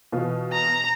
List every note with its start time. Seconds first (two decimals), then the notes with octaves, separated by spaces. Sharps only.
0.12 B2 E3 F4
0.53 A#5